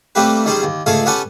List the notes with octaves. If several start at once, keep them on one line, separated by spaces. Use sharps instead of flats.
G3 A3 A#3 C4 G4 B4
D#3 G3 C#4 G#4 C5
D#2
C#2 A3 G#4 A4 F5 G#5
B3 C#4 G4 A4 F#5 G#5